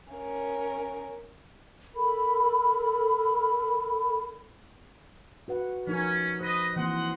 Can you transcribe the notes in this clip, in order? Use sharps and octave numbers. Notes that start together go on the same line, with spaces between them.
C#4 A#4
A4 A#4 B5
F#4 B4 F#5
F3 C#4 D#4 A#4
B4 C5 D#5
E3 A#3 C4 D#5 F#5 C6